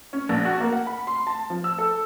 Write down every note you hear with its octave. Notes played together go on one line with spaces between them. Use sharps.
C#4
A#1
F#4
A#3
F#5
B5
C6
A5
F3
E6
A4